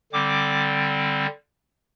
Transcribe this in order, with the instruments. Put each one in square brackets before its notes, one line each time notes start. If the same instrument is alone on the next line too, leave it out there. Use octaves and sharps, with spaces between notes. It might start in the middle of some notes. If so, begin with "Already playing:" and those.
[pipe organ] D3 G3 C4 D6